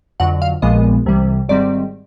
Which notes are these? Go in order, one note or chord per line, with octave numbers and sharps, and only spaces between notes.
F2 D3 F#3 F#5
F5
A#1 A#2 F3 G#3 B3 D#5
C2 C3 E3 G3
G#1 G#2 D#3 G3 C4 D5